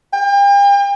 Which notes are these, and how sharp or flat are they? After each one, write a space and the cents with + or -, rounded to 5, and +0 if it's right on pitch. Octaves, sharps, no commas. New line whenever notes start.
G5 +40